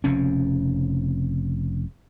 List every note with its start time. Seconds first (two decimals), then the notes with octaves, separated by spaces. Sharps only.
0.04 F1 F2 C#3 C#4